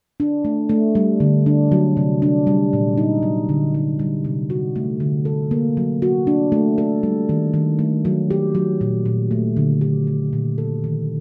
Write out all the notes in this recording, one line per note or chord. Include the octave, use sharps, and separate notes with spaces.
D4
A3
A3
G3
D3
D4
F#3
C3
D4
G3
A#2
D#4
F#3
D3
D#4
G3
C3
F#4
A3
D3
A4
A#3
F#3
F#4
D4
A3
A4
G3
D#3
D#3
A3
F#3
G4
F#3
A#2
A#2
A3
D3
G4
A3
A#2
A4
D#3